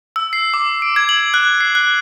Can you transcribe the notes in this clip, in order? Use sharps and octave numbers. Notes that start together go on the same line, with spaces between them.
E6
C7
D6
D7
G#6
F#7
F#6
C7
F#6